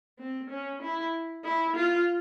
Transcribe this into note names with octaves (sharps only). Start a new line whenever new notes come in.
C4
C#4
E4
E4
F4